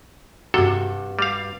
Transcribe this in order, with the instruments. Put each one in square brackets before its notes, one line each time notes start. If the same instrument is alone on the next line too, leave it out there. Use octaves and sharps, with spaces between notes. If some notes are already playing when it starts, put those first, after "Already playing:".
[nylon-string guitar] G2 F#4 [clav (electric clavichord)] C3 A4
[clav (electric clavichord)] G3 F5